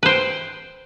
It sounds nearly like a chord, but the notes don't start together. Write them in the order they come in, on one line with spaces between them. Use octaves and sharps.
B4 C5 G5